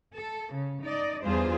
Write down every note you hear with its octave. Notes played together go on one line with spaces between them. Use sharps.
A4
C#3
D#4 D5 D#5
E2 G3 D4 F4 G#4 C5